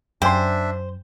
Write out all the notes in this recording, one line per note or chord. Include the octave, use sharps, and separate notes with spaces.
F#2 D4 C5 E5 G5 G#5 C6